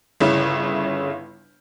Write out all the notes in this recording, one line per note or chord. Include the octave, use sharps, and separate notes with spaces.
G1 C#3 E4